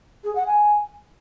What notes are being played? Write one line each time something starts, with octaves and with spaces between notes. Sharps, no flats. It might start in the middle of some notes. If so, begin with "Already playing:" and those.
G#4
F#5
G#5